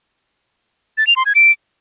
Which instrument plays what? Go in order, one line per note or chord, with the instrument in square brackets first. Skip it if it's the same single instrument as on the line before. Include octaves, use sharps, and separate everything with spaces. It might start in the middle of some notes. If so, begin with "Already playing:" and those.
[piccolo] A6
F7
C6
G#6
D7